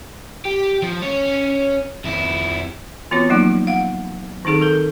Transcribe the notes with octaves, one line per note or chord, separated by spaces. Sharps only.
G4
F3
C#4 C#5
F2 E4
E3 B3 C4 F4 F#4 C#5
F3 F#3 A#3 D#4 D5
F5 F#5
D#3 C4 D#4 G#4 A4
A4 A#4